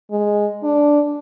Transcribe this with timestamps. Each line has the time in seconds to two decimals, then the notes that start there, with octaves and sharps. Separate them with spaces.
0.11 G#3
0.63 D4